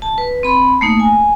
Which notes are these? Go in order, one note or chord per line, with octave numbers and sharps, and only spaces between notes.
A5
B4
C4 B5 C6
A3 A#3 D#4
G#5